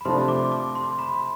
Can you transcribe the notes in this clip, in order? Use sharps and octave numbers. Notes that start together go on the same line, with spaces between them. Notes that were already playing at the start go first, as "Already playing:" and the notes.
B5
C3 F3 A3 D4 C6
D6
D6
C6
B5